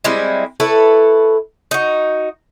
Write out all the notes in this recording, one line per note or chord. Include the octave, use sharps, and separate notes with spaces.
G3 G#3 C4 E4
E4 A4 B4 C#5
D#4 F#4